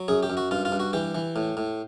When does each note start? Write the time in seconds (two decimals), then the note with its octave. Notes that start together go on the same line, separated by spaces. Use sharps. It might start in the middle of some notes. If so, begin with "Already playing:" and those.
Already playing: F#3
0.08 F#2 G#4
0.23 G4
0.30 F#2
0.37 F#4
0.51 G2 F4
0.65 F4
0.72 G2
0.80 F#4
0.93 E3 G4
1.15 E3
1.36 A2
1.57 A2